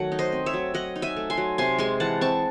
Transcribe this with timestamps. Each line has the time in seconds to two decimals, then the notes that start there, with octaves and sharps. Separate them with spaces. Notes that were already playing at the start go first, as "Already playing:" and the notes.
Already playing: D#3 F#3 A3 F#5
0.12 D#4
0.19 C5 D#5
0.32 C4
0.46 C#5 E5
0.53 F#3
0.74 F#3 D#5 F#5
0.96 D#4
1.02 E5 G#5
1.16 A3
1.30 G#5 C6
1.37 F#3
1.58 C3 G#5 C6
1.78 G#3 G#5 C6
2.00 E3 F#5 A5
2.21 C4 A5 C#6